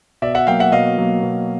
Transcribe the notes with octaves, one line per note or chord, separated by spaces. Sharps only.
B2 D5 E5
E5 F#5
F#3 A#3 F5 G5
E5 F#5
B2 D#5 F5
F#3 A#3
B2